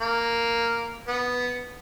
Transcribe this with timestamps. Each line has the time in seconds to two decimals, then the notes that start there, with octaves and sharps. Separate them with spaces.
0.01 A#3
1.08 B3